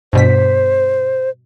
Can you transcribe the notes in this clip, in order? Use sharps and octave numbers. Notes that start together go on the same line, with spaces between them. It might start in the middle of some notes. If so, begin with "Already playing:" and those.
G2 B2 C5 B6